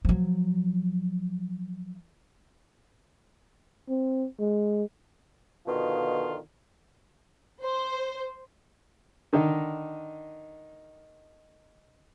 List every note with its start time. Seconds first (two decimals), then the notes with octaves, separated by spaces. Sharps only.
0.05 F3 F#3
3.89 C4
4.40 G#3
5.66 B2 D3 D#3 F3 F4
7.63 C5
9.33 D3 D#3 D#4